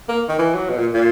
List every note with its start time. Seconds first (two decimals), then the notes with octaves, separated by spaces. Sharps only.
0.09 A#3
0.29 D#3
0.39 E3
0.55 F#3
0.69 B2
0.78 A#2
0.94 A#2